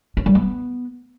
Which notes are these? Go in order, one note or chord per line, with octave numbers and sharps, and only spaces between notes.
C#4
G3
B3